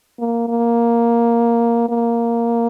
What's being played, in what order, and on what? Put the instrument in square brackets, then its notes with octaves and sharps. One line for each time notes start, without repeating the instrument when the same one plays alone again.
[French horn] A#3
A#3
A#3